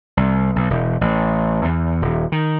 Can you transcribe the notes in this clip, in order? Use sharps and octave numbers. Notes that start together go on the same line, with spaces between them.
C2
B1
E1
A1
E2
D#1
D#3